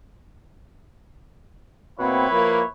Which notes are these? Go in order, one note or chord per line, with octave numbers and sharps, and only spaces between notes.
B2 A#3 C4 E4 B4 C#5
F3 A#3